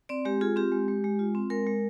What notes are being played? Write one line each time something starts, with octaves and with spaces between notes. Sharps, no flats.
C4 D5
G#3 G4
F4 G#4
C4 G4
G#3
G#3
G#3
F4
C4
G#3 A#4
G#3